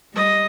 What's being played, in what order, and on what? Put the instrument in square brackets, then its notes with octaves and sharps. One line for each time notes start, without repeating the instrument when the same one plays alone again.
[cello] G3 [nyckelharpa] D#5